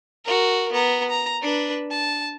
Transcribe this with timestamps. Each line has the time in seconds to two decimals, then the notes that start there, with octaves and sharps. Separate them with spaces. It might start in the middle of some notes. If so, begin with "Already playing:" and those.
0.25 F#4 A#4
0.72 B3 A#5
1.09 A#5
1.42 D4 B4
1.91 A5